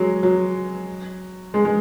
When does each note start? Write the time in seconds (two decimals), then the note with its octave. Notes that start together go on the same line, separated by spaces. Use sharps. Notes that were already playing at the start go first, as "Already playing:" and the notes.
Already playing: F#3 G#3
0.23 F#3
1.54 G#3
1.65 G#3